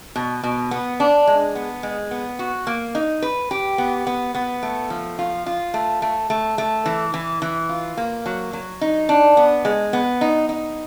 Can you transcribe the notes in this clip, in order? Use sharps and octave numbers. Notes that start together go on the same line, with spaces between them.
B2
B2
B3
D4
G#3
B3
G#3
B3
F#4
A#3
D#4
B4
G4
B3
B3
B3
A3
F3
F4
F4
A3
A3
A3
A3
E3
E3
E3
F4
A#3
F#3
F#3
D#4
D4
B3
G#3
B3
D#4
D#4